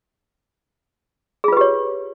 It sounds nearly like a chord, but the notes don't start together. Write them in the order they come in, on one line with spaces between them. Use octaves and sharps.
G#4 F4 B4 G4 C#5